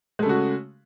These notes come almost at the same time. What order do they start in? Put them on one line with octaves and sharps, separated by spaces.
G#3 A3 C#3 F#4